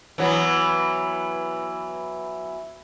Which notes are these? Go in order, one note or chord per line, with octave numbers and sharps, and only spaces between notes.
E3 F#3 B3